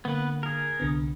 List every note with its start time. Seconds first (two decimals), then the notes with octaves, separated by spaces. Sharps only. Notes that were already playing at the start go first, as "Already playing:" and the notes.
0.05 D3 A#3 B3 B4
0.43 G#4 A#4
0.80 C2 D3 B3